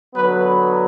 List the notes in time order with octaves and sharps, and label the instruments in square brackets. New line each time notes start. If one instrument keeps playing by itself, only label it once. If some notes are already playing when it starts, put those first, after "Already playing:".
[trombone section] D3 F#3 B3 B4